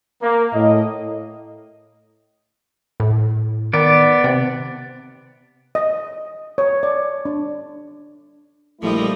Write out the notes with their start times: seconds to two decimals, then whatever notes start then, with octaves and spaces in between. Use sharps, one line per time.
0.22 A#3
0.54 A2 D#5
3.00 A2
3.73 D#3 B3 D5
4.24 C3
5.75 D#5
6.58 C#5
6.83 D5
7.25 D4
8.82 A#1 F3 G3 A3 E4 D#5